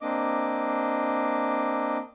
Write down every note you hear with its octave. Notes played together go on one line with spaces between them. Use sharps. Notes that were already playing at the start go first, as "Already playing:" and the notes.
A#3 C4 D4 D#5 D6